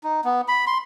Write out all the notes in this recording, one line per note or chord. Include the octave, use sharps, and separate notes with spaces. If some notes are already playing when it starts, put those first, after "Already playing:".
D#4
B3
B5
C6